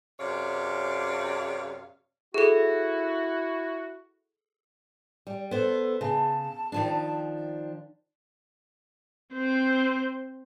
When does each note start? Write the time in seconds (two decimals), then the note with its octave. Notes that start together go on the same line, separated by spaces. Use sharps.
0.20 F#2 C3 G#4 C#5 D5 F5
2.34 E4 F#4 G#4 A4
5.27 G3
5.51 B3 A4 C5
6.01 C#3 A5
6.72 D#3 F3 D4
9.34 C4 C5